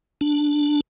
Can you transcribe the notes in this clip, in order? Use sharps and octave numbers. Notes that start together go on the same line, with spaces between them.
D4